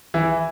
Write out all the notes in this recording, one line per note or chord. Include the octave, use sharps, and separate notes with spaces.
E3 E4